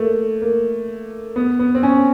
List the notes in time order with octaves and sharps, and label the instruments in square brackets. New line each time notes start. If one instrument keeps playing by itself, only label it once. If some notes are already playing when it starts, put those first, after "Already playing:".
Already playing: [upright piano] A3 A#3
A#3
B3
B3
C4
C#4